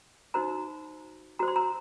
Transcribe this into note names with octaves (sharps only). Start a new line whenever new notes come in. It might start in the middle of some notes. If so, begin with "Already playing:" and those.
D#4 F#4 C5 A#5
F#4 C5 A#5
C6
A#5